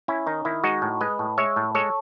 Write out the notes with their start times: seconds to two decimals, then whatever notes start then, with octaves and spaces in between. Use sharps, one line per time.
0.08 C#4 E4
0.26 D#3 D#4
0.45 D#3 E4
0.64 G#3 D#4 F#4
0.82 A2
1.01 G#3 B4 D#5
1.19 A2
1.38 G#3 C#5 E5
1.56 A2
1.75 G#3 A4 C#5